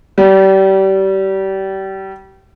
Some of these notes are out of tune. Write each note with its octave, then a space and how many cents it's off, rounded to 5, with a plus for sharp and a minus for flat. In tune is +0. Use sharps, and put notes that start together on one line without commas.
G3 -30